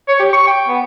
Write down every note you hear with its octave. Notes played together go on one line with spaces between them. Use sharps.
C#5
G4
C#6
G5
B3